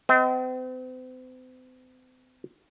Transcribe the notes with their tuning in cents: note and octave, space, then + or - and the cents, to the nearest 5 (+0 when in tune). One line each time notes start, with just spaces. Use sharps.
C4 -40 D#5 +25